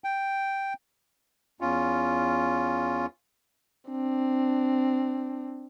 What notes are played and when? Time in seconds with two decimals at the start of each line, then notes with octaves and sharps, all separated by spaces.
0.04 G5
1.61 E2 C#4 F4
3.90 C4 D4